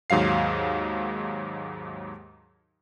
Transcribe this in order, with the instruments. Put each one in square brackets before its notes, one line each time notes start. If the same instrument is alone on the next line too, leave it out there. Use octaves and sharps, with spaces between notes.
[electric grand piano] D#2 G#2 F#3 F5 C7